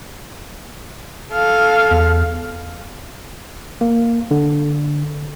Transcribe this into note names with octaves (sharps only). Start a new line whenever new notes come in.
A4 F5
E2
A#3
D3